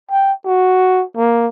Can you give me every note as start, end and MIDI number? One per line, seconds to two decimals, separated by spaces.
0.11 0.33 79
0.45 1.04 66
1.17 1.47 58